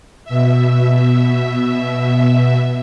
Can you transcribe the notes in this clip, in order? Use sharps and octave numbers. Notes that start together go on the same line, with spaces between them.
B2 E5